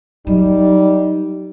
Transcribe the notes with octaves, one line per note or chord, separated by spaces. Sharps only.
F#3 G3 D#4